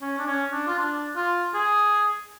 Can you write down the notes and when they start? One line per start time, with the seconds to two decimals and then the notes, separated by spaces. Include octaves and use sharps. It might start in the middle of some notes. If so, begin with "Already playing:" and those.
0.02 C#4
0.19 D4
0.27 C#4
0.53 D4
0.67 F4
0.78 D4
1.16 F4
1.55 G#4